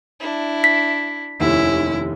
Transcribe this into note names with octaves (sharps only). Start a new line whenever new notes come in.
D4 E4
B6
F1 D#2 C#4 E4